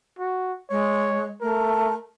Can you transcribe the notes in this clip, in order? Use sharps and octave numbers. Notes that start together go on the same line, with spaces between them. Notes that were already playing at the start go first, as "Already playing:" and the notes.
F#4
G#3 C#5
A3 A#4